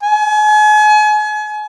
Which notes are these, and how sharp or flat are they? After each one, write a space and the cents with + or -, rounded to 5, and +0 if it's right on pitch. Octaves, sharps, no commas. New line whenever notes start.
G#5 +35